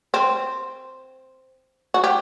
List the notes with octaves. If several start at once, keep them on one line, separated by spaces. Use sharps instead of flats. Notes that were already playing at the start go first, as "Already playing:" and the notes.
C4
F#4
G4